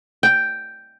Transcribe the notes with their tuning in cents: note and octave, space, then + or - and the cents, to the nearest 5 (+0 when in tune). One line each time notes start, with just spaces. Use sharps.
G5 +0